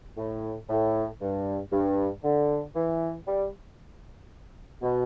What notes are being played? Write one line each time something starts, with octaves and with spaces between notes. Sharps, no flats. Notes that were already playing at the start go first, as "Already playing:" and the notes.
A2
A2
G2
G2
D3
E3
G3
B2